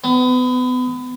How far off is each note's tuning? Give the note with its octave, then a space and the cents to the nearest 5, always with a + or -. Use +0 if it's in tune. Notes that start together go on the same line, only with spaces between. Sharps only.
B3 +30